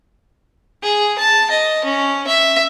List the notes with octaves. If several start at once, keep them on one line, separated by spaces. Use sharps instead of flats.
G#4
A5
D#5
C#4
E5